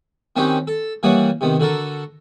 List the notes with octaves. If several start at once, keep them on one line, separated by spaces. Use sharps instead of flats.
D#3 C4 C#4 D#4 F#4 G4
A4
E3 G3 A#3 C#5 F#5 D#6
C3 D#3 B3
D3 F#4 A4 A#4